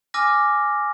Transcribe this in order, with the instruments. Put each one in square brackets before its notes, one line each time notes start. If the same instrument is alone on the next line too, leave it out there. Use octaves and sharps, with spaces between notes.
[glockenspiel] G#5 D6 E6 F6 A#6